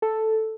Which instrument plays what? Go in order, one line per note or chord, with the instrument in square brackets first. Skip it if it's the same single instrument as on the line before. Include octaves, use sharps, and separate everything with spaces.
[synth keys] A4